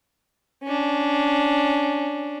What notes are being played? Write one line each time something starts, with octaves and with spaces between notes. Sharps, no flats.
C#4 D4